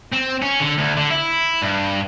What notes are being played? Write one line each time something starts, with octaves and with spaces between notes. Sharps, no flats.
C4
C#4
D3
D2
D3
E4
G2